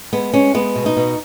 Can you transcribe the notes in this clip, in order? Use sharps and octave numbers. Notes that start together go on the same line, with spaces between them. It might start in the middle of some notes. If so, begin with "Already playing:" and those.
G#3 B3
G#3 C#4
G#3 B3
B2
D#4
B2